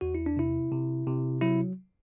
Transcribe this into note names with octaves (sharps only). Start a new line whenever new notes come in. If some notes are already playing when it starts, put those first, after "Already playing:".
E2 F#4
E4
D4
C3 E4
C3
C3
F#3 E4